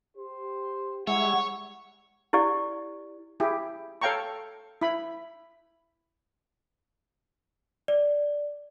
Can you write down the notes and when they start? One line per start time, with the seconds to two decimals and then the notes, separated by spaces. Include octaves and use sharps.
0.17 G4 C5
1.07 G3 G#3 E4 C#5 E5 F#5 G#6
2.33 E4 G4 D5
3.40 E4 G4 G#4
4.01 A4 C#5 F5 G5 A#5 C#6
4.82 E4 B5
7.88 D5